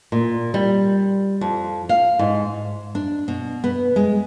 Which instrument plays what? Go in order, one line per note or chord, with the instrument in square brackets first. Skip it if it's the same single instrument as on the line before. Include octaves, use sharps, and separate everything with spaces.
[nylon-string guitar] A#2
G3
F2
F5
G#2
D4
B2
B3
G#3